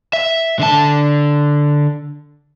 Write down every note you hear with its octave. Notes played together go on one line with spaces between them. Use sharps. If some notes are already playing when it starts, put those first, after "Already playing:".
E5
D3 A5